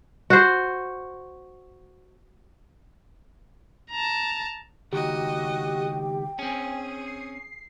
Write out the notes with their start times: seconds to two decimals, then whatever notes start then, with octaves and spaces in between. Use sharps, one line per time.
0.30 F#4 C5
3.91 A5 A#5
4.92 C#2 D#3 F#4 G4 D#5 G5
6.39 C4 C#4 G#4 G#5
7.07 C7